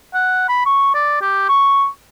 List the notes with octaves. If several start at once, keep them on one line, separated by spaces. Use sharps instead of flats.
F#5
B5
C#6
D5
G4
C#6